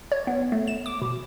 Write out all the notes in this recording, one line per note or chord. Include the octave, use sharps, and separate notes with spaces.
C#5
B3
A3
E7
D6
B2